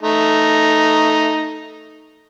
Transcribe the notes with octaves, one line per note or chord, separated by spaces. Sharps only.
A3 D#4